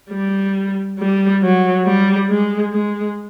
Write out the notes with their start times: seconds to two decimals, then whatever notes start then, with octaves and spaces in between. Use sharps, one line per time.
0.10 G3
0.99 G3
1.42 F#3
1.85 G3
2.29 G#3
2.73 G#3